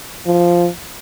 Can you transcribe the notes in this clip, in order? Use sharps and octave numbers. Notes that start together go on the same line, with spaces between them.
F3